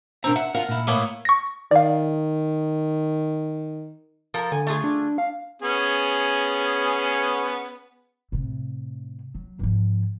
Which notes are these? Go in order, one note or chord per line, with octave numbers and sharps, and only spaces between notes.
B2 C4 D4 A#4 A#5
E5 F#5
F4 A#4 F5 F#5
A#2 E4
A2 A#3 B3
C#6 A#6
D#3 D5 F5
F3 A4 A#4
D3 G#5
A3 F4 G#4
D4
F5
B3 C#4 G#4
A2 C3
F#3
G#2 F3